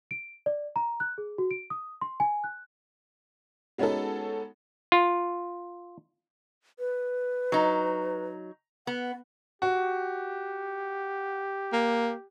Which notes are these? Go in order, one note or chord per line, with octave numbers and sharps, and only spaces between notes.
D7
D5
A#5
F#6
G#4
F#4
D7
D#6
C6
G#5
F#6
G#3 B3 C#4 D#4 F#4 A4
F4
B4
F#3 D#4
B3 F#5
F#4 G4
A#3